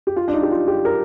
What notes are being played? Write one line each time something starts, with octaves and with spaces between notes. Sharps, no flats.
G4
F4
D4
D#4
G4
F4
G4
A#4